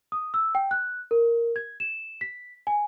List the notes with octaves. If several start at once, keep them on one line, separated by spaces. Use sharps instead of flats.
D#6
E6
G5
F#6
A#4
G#6
E7
B6
G#5